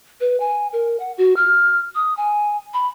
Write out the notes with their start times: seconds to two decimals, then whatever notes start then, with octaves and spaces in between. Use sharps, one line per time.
0.21 B4
0.40 G#5
0.73 A#4
1.00 F#5
1.18 F#4
1.36 F6
1.95 D#6
2.17 G#5
2.74 B5